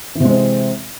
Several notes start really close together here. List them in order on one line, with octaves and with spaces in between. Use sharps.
E3 C3 G#3 C4